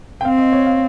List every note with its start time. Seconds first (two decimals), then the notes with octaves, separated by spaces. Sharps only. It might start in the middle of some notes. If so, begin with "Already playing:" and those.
0.21 G5
0.25 C4 F5
0.38 D#5
0.52 C#5
0.66 F5